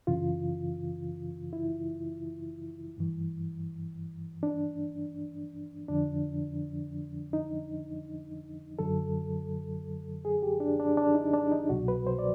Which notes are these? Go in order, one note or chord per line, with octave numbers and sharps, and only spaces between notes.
F#2 C#3 E3 F4
E4
G2 E3
D4
F2 D3 F3 D4
D#4
F#2 D3 F#3 A4
G#4
G4
D4
D4
D4
D#4
D4
D#4
C2 B2 F#3 F#4
B4
C5
D5